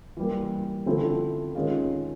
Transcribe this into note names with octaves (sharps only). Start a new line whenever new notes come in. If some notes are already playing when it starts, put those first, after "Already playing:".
E3 G3 A#3
D3 F3 A3 C4 E4
D#3 G#3 C#4 F4